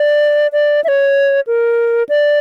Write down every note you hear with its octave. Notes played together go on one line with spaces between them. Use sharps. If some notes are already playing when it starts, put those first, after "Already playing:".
Already playing: D5
D5
E5
C#5
A#4
D5